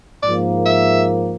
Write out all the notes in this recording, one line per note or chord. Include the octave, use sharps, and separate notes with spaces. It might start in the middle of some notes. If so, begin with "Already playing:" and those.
G#2 F3 A#3 D5
E5